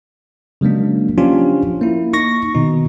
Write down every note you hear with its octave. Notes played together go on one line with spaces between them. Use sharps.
C#3 F#3 G#3 A#3 D4
F3 C#4 D4 F4 G4
A#3 E4
D#4 C#6 A#6
B2 D#3 D#4